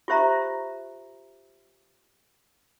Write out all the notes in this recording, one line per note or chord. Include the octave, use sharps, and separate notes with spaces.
F4 G4 C5 E5 A#5